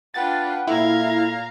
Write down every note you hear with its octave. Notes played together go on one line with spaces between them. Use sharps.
D4 F4 B4 F#5 G5 A6
A#2 A#3 E4 A4 F5 A#5 G#6